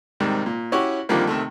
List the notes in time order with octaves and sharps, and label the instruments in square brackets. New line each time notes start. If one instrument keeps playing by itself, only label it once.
[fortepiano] G#2 C3 D#3 G3
A#2
C#4 E4 F#4 G4 C#5
F2 D3 D#3 F3 G3 A#3
C3 D#3 A3